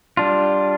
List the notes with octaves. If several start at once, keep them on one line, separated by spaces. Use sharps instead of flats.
G3 D4 F4